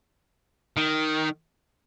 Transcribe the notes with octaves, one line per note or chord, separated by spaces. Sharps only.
D#3